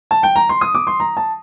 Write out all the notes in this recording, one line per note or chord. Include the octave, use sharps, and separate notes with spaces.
A5
G5
A#5
C6
D#6
D6
C6
A#5
A5